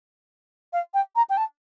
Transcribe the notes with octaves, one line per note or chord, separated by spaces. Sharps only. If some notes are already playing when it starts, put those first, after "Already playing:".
F5
G5
A#5
G5
A5